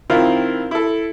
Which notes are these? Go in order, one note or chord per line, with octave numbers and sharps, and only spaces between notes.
D#3 C4 E4 F4 A#4
E4 A4